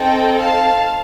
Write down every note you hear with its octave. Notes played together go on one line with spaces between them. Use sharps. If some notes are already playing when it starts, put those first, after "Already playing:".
Already playing: C4 D#4 A4 D#5 G5
F5 A5